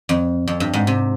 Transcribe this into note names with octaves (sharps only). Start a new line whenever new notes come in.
F2
F2
G2
G#2
C3